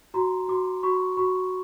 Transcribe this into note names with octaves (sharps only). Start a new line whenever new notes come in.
F#4 A#5 C6
F#4 C6 D6
F#4 B5 C#6
F#4 B5 C#6